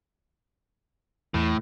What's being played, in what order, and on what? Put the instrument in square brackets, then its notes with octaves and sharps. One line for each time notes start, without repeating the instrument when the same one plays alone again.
[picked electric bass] E2 [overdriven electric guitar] A2